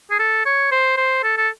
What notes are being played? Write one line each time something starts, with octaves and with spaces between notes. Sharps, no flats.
G#4
A4
C#5
C5
C5
A4
A4